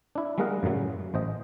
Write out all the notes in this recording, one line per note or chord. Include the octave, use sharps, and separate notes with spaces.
D4 E4
G3 G#3 A#3 A#4 D#5 F#5
F#2 A2 C#3 F#3
A1 C5 D#5